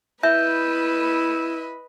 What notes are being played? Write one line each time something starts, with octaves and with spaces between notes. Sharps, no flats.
E4 B4 D#5 E5 B5 G6